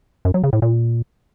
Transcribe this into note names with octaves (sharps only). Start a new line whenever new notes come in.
F#2
F#3
C#3
A2
A#2